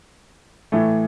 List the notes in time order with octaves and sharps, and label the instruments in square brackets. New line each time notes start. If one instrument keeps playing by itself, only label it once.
[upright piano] A2 E3 A3